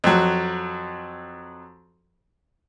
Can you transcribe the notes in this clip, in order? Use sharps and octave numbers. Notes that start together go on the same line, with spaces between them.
F2 F#3